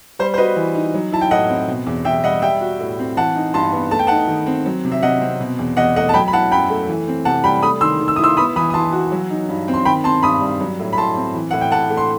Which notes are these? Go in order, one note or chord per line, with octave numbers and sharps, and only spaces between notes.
G3 C5
C5
F#4 B4 D#5
E3
D#4
F#3
E4 A5
G5
A2 D#5 F#5
C4
B2
E2
E2 E5 G5
G3 D#5 F#5
G3 E5 G5
F#4
A2
C4
E3 F#5 A5
D#4
G2 A5 C6
B3
A3 A5
G5
D#4 F#5 A5
D#3
C4
F#3
C3
E5
C3 D#5 F#5
C4
B2
E2
E2 D#5 F#5
A3 D#5 F#5
A5
F#3 G5 B5
B5
E4 F#5 A5
F#2 G5 B5
A3
E3
C4
C3 F#5 A5
G3 G5 B5
A3 B5 D#6
D#3 C6 E6
D#3
E6
E4 D#6
C6 E6
B3 B5 D#6
E3 B5 D#6
D#6
E3 A5 C6
F#4
F#3
D#4
G2
C4
C6
D#3 G5 B5
C4 A5 C6
G2 B5 D#6
G3
F#3
A2
B5
A2 A5 C6
C4
E3
A2 F#5
G5
A2 F#5 A5
A3
C6